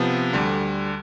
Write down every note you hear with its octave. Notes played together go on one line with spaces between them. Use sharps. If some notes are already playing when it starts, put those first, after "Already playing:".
Already playing: C3 F3 B3
D2 D3 G3